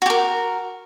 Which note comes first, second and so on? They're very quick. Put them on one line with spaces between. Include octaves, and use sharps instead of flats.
F#4 G4 A#4